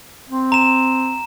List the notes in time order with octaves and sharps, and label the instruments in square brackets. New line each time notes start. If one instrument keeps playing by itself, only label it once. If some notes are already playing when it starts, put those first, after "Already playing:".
[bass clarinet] C4
[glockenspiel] A#5 E7